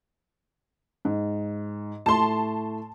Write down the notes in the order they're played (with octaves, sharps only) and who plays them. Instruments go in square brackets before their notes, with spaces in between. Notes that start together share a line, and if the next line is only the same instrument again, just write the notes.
[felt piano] G#2
[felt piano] A2 A3 [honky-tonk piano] A5 C6